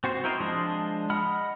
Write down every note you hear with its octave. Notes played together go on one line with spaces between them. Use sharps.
C4 F#4 C5
C4 E4 A#4 C5 D#5
F3 G#3 D4 D#5
D#5 F#5 B5 F6